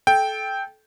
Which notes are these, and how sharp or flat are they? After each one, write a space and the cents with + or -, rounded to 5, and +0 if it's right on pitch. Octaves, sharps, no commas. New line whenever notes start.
A4 -25 G5 +0